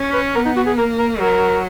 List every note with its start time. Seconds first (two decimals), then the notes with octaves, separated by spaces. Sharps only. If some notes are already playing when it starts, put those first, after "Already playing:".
Already playing: C#4
0.13 B4
0.35 B3 A#4
0.46 D#4
0.56 F#4
0.67 G#4
0.78 A#3 A#4
0.99 A#4
1.20 F#3 A#4